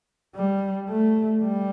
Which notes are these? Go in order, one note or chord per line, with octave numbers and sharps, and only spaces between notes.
G3
A3
G3